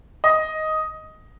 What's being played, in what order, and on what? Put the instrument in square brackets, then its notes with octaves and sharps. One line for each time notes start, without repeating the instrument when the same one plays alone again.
[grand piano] D#5